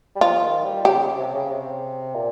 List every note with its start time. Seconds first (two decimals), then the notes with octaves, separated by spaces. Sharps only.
0.16 G3
0.21 F3 F4
0.42 D#3
0.64 G3
0.85 C#3 G4
1.17 C3
1.34 C#3
1.50 C3
2.15 A#2